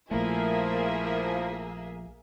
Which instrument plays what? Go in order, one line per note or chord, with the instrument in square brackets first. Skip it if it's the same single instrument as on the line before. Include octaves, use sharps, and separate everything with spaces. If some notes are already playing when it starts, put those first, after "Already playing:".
[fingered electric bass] A#1 A3 [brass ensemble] F3 [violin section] A#3 G#4 E5 [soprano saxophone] E4